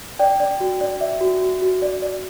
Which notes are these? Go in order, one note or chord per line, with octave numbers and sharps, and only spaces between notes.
D5 G5
D5
F#4
D5
D5 E5
F#4
F#4
F#4
D5
D5